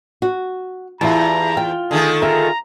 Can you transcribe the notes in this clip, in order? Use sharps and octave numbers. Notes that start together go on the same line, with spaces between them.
F#4
E2 E4 F4 G4 A5 A#5
F4 G5
D3 D#3 A3 G#4
F4 G#4 A#4 E5 A#5